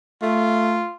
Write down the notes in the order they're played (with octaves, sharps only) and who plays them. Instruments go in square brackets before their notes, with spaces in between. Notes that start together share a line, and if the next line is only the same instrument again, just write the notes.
[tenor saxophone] A3 [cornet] F4